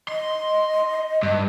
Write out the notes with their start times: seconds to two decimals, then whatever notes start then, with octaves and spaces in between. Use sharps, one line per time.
0.09 D#5 C6
1.23 G2